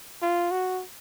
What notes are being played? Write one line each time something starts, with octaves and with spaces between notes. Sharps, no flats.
F4
F#4